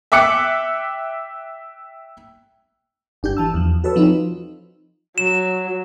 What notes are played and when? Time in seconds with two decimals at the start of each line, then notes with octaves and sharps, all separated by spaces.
0.12 E5 G5 D6 F#6 C#7
3.23 G1 D4 G4 G6
3.37 E3 A5 E6
3.54 E2 F3
3.84 F#4 A4 B4 C#5 E6
3.96 F3 C4 D#4
5.18 F#3 E7